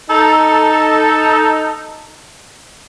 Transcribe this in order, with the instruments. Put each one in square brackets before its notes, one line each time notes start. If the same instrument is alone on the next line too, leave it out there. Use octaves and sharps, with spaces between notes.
[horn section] D#4 A4